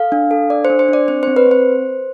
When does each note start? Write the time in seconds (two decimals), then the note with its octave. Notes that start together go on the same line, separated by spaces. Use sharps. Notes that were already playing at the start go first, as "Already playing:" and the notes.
Already playing: A4 F5
0.12 D4
0.31 A4
0.50 D4 D5
0.65 C5
0.70 D4
0.79 C5
0.88 D4 D5
1.08 C4 C5
1.23 C4 C5
1.36 B4
1.46 C4
1.51 C5